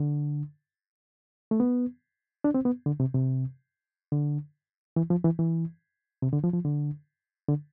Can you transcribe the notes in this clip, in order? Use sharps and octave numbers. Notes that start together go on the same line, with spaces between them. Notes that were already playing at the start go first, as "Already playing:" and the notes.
Already playing: D3
A3
B3
D4
C4
B3
D3
C3
C3
D3
E3
F3
E3
E3
C3
D3
F3
F3
D3
D3